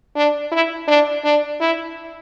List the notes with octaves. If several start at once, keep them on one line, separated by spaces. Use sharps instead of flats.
D4
E4
D4
D4
E4